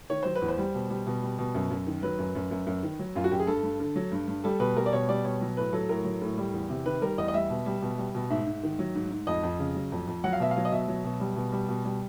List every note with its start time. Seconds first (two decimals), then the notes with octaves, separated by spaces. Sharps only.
0.10 D#3 C#5
0.23 F#3 C5
0.35 B4
0.42 E2
0.48 C5
0.58 G3
0.75 B2
0.90 G3
1.06 B2
1.22 G3
1.39 B2
1.55 F#2
1.71 F#2
1.87 D#3
2.03 F#3 B4
2.18 F#2
2.35 F#2
2.51 F#2
2.67 F#2
2.83 D#3
2.99 F#3
3.15 F#2 F4
3.24 F#4
3.31 F#2 G4
3.39 G#4
3.47 G2 A4
3.63 G2
3.80 D3
3.96 F#3
4.12 G2
4.28 G2
4.44 G3 A4
4.60 B2 B4
4.77 G3 A#4
4.86 D5
4.93 B2 C#5
5.09 G3 D5
5.25 B2 C#5
5.41 F#3
5.57 A2 B4
5.73 F#3 A4
5.89 A2 A#4
6.05 F#3
6.22 A2
6.38 G3
6.53 E2
6.70 C3
6.86 D#3 B4
7.02 G3 A#4
7.18 E2 D#5
7.28 D#5
7.34 G3 E5
7.50 B2
7.66 G3
7.82 B2
7.98 G3
8.15 B2
8.30 G#2 E5
8.46 G#2
8.63 D#3
8.79 F#3
8.95 G#2
9.11 G#2
9.27 F2 D#5
9.43 F2
9.59 C#3
9.75 F#3
9.92 F2
10.07 F2
10.24 F#3 F#5
10.33 F5
10.40 B2 E5
10.51 F5
10.56 F#3
10.65 D#5
10.72 B2 E5
10.88 F#3
11.04 B2
11.20 G3
11.36 B2
11.52 G3
11.69 B2
11.85 G3